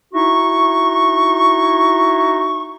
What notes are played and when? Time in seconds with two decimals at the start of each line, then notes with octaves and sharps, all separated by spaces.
0.14 D#4 E4 F#4 E5 C#6